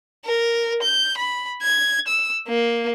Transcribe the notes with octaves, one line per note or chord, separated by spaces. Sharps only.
A#4
G6
B5
G#6
E6
A#3